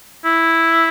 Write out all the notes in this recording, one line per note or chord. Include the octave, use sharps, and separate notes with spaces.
E4